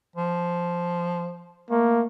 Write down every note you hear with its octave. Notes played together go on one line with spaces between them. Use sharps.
F3
A3 A#3